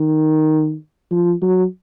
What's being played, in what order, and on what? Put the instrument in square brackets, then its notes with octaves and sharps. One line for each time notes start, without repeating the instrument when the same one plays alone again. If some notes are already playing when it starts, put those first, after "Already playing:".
Already playing: [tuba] D#3
F3
F#3